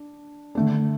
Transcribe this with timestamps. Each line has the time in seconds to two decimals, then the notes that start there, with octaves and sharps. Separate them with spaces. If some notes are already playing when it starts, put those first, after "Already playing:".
Already playing: D4
0.55 D3 A3 D4